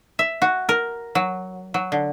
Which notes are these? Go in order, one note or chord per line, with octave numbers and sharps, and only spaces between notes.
E5
F#4
A#4
F#3
F#3
D3